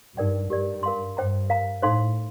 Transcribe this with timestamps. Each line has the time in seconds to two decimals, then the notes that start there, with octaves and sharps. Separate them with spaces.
0.17 G2 D#4 A#4 D5 G5
0.50 G2 G4 A#4 D5
0.83 A#4 F5 C6
1.17 G2 C5 G5 A#5
1.49 A#4 F5 A#5
1.82 A2 D#4 A4 C5 F5 C6